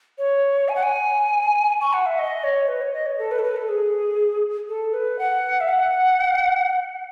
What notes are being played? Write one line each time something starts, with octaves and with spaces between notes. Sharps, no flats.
C#5
G#5
F#5
G#5
C#6
F#5
E5
D#5
C#5
B4
C#5
D#5
C#5
A4
B4
A4
B4
A4
G#4
A4
B4
F#5
E5
F#5